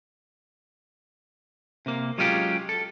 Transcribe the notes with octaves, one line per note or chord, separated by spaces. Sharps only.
C3 A#3
F#3 G#3 C#4 F4 G4
A4